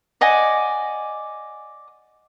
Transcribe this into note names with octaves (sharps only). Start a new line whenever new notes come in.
D5 D#5 F#5 G#5